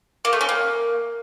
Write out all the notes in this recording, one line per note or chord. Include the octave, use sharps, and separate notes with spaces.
A#3
A3
C#4
A#3